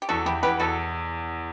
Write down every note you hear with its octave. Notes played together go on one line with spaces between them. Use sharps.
G4
E2 F#4 A4
E2 E4 G4
E2 G4 B4
E2 F#4 A4